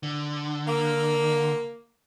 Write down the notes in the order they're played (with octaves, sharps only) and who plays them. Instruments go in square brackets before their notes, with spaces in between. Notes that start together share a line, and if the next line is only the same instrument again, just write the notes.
[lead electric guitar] D3
[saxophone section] A#3